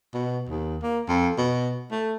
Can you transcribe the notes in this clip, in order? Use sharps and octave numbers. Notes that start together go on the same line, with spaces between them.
B2
D#2
A#3
F2
B2
A3